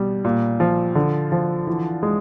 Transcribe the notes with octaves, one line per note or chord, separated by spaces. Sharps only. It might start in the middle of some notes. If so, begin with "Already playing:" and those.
Already playing: B2 G3
A#2
F3
D3
F3
E3
G#3